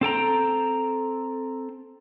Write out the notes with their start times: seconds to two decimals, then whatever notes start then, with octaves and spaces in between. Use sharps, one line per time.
0.01 C4 A4 G5 A#5